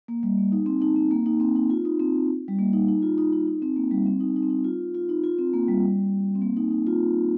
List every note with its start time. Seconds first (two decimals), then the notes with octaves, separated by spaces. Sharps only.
0.08 A#3
0.23 G3
0.38 A#3
0.52 D#4
0.66 C4
0.82 D#4
0.96 C4
1.11 A#3
1.26 D#4
1.40 C4
1.56 D#4
1.70 F4
1.85 D#4
1.99 C4
2.48 G3
2.59 A#3
2.73 D#4
2.88 D#4
3.02 F4
3.18 D#4
3.33 D#4
3.47 D#4
3.62 C4
3.76 A#3
3.91 G3
4.06 C4
4.20 D#4
4.36 D#4
4.43 C4
4.50 D#4
4.64 F4
4.94 F4
5.09 D#4
5.24 F4
5.38 C4
5.54 A#3
5.69 G3
6.35 C4
6.42 A#3
6.57 D#4
6.71 D#4
6.87 F4